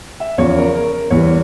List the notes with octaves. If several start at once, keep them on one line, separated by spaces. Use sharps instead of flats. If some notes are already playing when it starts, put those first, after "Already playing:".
E5
E2 C#3 F3 C#5
A#4
A#4
A#4
E2 E3 G3 C#5